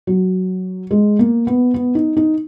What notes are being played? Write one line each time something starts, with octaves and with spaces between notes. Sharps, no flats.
F#3
G#3
A#3
B3
B3
D#4
D#4